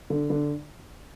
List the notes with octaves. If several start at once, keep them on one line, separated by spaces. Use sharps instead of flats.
D3
D3